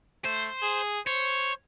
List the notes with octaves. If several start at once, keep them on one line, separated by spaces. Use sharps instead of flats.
A3 C5
G#4
C5 C#5